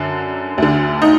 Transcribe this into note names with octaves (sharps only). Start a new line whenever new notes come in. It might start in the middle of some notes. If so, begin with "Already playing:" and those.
Already playing: F#2 D3
D2 D3
D#4